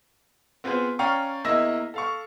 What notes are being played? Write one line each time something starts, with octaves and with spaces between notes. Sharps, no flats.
B3 C4 F4 G#4 B4 C5
C#4 D5 F5 G5 A#5 C#6
E2 A#3 E4 D#5 E6 A#6
A4 F5 C#6